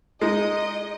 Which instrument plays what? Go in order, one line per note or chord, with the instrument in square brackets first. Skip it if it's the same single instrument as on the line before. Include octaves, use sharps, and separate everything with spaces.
[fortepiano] G#3 D#4 [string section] D#5